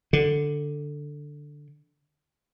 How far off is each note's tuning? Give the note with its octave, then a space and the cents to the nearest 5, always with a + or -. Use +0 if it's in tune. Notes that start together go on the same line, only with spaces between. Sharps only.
D3 +5